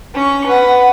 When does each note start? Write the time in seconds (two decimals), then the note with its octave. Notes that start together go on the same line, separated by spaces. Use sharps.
0.14 C#4 C#6
0.46 B4 F#5